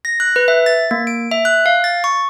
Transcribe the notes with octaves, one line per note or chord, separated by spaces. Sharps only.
A#6
F#6
B4
E5
A6
A#3
D7
E5
F#6
F5
A6
C#6